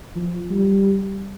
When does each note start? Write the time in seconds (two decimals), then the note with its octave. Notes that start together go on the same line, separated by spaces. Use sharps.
0.16 F3
0.50 G3